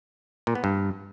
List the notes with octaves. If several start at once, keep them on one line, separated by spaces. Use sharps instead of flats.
A#2
B3
G2